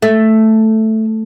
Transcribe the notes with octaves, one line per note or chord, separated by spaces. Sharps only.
A3